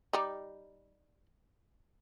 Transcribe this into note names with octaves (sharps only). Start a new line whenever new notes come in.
G3 D#4